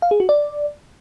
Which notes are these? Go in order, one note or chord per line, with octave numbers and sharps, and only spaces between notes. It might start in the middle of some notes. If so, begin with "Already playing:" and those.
F5
G#4
F#4
D5